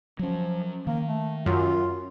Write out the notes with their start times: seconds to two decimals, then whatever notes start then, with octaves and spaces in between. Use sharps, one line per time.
0.19 F3 F#3 C#4
0.87 D#3 A#3
1.08 A3
1.46 F#2 F4